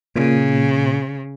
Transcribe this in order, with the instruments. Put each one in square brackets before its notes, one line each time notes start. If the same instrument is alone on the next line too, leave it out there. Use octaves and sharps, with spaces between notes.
[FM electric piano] A#2 [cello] C#3